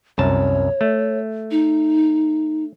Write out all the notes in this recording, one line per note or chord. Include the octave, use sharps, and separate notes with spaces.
C2 F#2 C#5 A5
A3
D#4